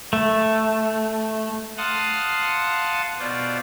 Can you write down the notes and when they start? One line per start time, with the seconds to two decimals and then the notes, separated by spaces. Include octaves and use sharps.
0.13 A3
1.77 F5 F#5 A5 C6 D#6
3.19 B2 F4 C5 D5